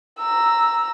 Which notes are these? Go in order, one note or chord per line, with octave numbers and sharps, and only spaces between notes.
A#5 E6